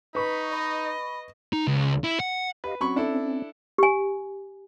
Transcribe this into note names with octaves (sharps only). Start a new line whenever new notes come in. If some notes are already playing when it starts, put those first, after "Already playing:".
D#4 B4 B5 C#6
D#5 B5
D#4
C#2
E4
F#5
G4 B4 D#5 F5
F#3 C4 C#4 B5 C#6
D4 E4 A4
G4 G#5